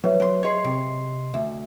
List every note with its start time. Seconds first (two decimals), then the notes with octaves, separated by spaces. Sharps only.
0.04 F#3 B4 C#5 E5
0.20 F#3 C6
0.43 G#4 C#5 D#5 C6 C7
0.64 C3
1.34 D2 E5